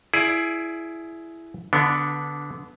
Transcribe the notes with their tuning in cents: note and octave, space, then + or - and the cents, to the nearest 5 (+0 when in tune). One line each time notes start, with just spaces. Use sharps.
E4 +10 G#4 +20 D5 +0
D3 -15 B3 +0 D4 +0